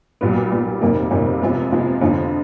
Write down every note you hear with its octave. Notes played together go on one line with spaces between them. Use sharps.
B1 A#2 G3 B3
B1 A#2 G3 B3
F2 C3 D#3 G3 A#3
F2 C3 D#3 G3 A#3
C3 F3 G#3 B3
C3 F3 G#3 B3
F2 D3 F3